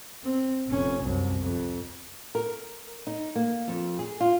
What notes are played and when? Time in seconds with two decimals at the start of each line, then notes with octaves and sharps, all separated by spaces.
0.24 C4
0.68 F1 C#4
1.01 C2 F#2
1.39 F2
2.35 A#4
3.07 D#4
3.35 A#3
3.68 F2
3.99 G#4
4.21 F4